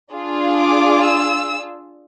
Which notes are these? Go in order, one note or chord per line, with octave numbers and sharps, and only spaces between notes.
D4 F4 G#4
D6
E6